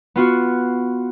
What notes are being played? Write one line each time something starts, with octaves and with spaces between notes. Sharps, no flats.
B3 F4 F#4